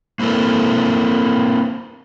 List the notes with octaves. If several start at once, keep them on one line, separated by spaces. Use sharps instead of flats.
A#3 C4 E4 A4 A#4